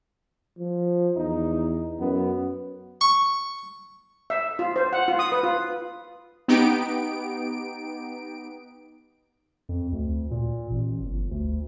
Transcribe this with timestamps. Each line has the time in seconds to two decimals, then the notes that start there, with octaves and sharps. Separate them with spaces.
0.58 F3
1.17 E2 D#4
2.00 F#2 B3
3.01 C#6
4.30 E5
4.59 F4
4.76 C5
4.93 F#5
5.08 F4
5.19 D#6
5.32 B4
5.43 F4
6.48 B3 D#4 G4 D7
9.69 F2
9.92 D2
10.31 A#2
10.71 A1
11.05 G1
11.31 D2